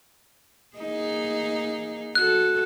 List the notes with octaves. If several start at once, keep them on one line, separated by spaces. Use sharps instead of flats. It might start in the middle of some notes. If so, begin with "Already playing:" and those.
A#3 D#4 G#4
F#4 A4 F#6